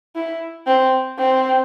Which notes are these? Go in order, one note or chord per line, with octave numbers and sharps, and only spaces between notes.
E4
C4
C4